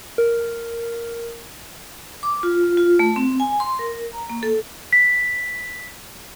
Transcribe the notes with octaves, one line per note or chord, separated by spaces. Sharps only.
A#4
D6
F4
F4
A3
C4
G#5
C6
A#4
A#5
A#3
A4
B6